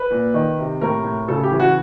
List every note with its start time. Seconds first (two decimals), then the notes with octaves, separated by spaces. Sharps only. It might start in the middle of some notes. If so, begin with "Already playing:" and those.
Already playing: B4
0.11 A#2
0.34 D#3
0.58 C3
0.81 A2 A#4
1.04 A2
1.28 C#3 A4
1.43 G4
1.51 E3
1.60 F#4